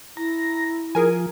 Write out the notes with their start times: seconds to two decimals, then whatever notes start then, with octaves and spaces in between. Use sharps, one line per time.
0.17 E4 A#5
0.95 F3 G#4 A#4 G#5